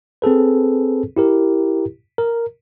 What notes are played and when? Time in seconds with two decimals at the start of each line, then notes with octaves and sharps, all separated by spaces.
0.22 C4 G#4 A4 B4
1.17 E4 G4 A#4
2.18 A#4